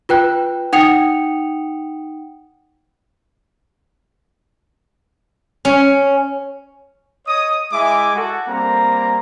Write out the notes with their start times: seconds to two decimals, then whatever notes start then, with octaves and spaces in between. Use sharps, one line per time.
0.09 F4 B4 G5 F#6
0.73 D#4 F#5 G5 D#6 C#7 F7
5.65 C#4
7.27 C#5 D#5 D#6
7.72 G#3 E4 E5 G#5 D6
8.16 F#4 A4
8.48 G3 A#3 C4 A#5